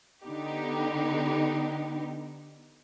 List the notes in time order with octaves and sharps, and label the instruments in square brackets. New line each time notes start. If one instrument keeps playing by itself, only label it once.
[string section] D3 B3 D#4 G4